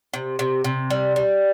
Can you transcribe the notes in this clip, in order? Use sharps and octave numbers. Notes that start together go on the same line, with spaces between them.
C3
C3
C3
G3
G3